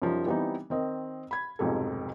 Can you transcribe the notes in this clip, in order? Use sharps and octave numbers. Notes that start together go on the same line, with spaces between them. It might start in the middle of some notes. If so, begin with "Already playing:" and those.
F#2 F3 G3 D#4
E3 G3 B3 C4 D#4
D#3 C4 D#5
B5 G#6
F1 B1 F2 G#2 G4 A4